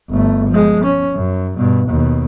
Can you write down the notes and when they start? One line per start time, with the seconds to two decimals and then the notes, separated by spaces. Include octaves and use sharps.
0.10 G1 A3
0.49 F3 G#3
0.85 C#4
1.16 F#2
1.57 G2 B2
1.89 D#2 B2